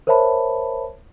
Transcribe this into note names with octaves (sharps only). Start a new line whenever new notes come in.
A#4 C5 C#5 E5 A5 B5